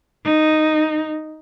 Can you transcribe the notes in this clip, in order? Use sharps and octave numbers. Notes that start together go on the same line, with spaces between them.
D#4